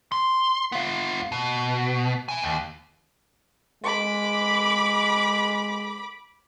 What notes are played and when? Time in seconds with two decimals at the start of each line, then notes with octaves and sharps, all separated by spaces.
0.12 C6
0.72 B3 F4
1.32 B2
2.29 E4 G#5
2.41 D#2
3.84 G#3 B5 D6